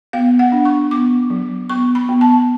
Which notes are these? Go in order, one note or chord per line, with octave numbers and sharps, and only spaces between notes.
B3 F5
F#5
D4
C#6
B3 D6
F#3
B3 C#6
B5
B3
A5